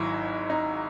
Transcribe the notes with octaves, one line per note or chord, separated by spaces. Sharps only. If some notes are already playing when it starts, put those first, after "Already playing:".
Already playing: G#1 G#2 F#3 E4
D#4